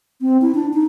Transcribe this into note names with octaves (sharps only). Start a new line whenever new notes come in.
C4
E4
D4
D#4